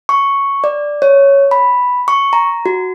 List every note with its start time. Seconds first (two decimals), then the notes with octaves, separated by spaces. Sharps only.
0.09 C#6
0.64 D5
1.02 C#5
1.51 B5
2.08 C#6
2.33 A#5
2.66 F#4